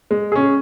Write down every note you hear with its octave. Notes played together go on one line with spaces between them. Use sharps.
G#3
C#4 G#4